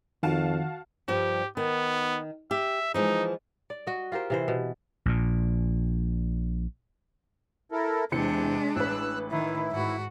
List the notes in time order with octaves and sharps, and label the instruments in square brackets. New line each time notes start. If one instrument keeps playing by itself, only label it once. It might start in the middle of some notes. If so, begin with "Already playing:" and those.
[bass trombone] F2 [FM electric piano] D#3 [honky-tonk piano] F#4 F5 A5
[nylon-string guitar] G2 F3 G3 [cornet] G4
[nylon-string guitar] D#3 [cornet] B3
[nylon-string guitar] G4 [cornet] E5
[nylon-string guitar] E3 F3 G#3 [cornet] D#4
[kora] D5
F#4 D#5
F4 G4 A#4 C5
C3 E3 C5
B2
[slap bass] A#1 A#2
[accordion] E4 A4 A#4
[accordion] E2 [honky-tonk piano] C3 E3 C#7 [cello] G#3 D4
[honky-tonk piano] A1 B4 [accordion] E6 F#6
[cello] D#3 [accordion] E4
[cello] G#2 F#4